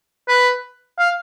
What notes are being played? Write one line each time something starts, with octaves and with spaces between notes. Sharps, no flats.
B4
F5